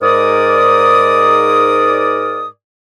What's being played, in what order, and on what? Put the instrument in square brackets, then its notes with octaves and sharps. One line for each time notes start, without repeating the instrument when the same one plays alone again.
[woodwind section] G#2 A#4 D5 D#6